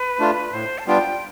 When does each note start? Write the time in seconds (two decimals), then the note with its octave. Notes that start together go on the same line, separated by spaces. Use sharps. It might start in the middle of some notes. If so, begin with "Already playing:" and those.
Already playing: B4
0.19 A3 D4 F4
0.53 A2 C5
0.79 A5
0.86 G3 B3 D4 F4 G5